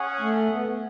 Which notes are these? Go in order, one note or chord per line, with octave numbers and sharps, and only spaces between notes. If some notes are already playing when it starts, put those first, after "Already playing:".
Already playing: C#4 G#4 C#5 F#5
A3
B3